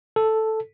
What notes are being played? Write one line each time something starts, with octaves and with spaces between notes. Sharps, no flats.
A4